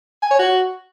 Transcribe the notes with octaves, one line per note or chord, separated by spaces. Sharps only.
G#5
C#5
F#4